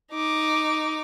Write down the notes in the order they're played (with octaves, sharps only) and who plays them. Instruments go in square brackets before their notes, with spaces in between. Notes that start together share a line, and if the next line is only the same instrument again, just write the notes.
[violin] D#4 D6